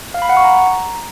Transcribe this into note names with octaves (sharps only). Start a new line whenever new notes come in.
F5
B5
F#5
C#6
A#5